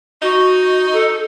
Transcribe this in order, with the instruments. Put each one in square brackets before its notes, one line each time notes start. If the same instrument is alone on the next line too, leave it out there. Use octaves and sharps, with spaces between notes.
[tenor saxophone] D#4 [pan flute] F#4
[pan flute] A4